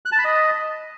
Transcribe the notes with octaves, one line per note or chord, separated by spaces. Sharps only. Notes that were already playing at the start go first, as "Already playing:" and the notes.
F#6
A5
B5
D#5